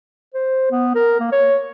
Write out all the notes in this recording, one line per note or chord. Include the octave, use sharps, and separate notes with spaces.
C5
B3
A#4
A#3
C#5